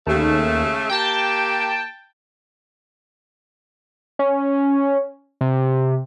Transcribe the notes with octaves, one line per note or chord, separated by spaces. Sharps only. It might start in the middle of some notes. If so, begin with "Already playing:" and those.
D#2 C#3 A3
A#3 G4 G5 A5
C#4
C3